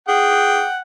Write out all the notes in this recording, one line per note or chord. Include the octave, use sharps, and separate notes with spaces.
G#4 F#5 G5